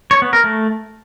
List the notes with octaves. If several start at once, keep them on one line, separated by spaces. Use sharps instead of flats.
C#5
B3
A#4
A3